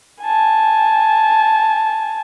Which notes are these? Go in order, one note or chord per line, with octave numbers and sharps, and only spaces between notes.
G#5 A5